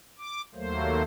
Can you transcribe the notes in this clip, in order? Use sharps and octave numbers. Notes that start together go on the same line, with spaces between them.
D6
D#2 F#3 A3 A#3 C5